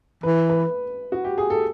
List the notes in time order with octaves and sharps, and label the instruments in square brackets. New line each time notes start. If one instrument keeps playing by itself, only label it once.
[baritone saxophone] E3 [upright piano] B4
[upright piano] B4
F#4
G4
G#4
A4